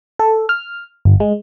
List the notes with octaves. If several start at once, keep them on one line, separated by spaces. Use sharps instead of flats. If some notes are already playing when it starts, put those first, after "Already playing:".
A4
F6
G1
G#3